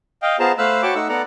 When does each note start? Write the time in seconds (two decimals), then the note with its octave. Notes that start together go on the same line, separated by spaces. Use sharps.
0.22 D#5 F5 G5
0.39 B3 F4 G#4 C5 A5 A#5
0.58 A3 C5 F5 B5 E6 F#6
0.83 F#4 C#5 G5 A5 B5 D6
0.95 A3 D#4 F#5 E6
1.09 B3 A4 D5 F#5 A#5